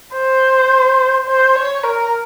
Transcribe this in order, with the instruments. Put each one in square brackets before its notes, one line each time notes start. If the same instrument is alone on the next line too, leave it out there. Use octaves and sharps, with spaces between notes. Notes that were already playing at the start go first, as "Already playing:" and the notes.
[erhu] C5
C5
C#5
A#4